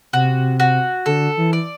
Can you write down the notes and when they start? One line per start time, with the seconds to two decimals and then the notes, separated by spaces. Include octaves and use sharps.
0.13 C3 F#4
0.60 F#4
1.06 D3 A4
1.37 E3
1.53 D5